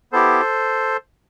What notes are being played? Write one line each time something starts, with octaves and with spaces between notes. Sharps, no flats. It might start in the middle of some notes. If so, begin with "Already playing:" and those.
B3 E4 G4 A4 C5